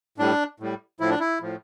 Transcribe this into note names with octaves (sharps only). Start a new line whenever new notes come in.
A2 G3 D4
A2 G3
A2 F3 E4
D4
E4
A2 F3